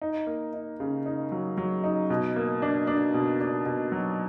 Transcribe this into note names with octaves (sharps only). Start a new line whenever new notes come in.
D#4
A#3
D#4
C#3
D#4
F#3
F#3
D#4
B2
A#3
D4
D4
B2
D4
B2
F#3